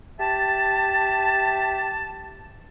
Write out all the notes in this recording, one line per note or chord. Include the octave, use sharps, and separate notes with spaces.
G4 E5 A5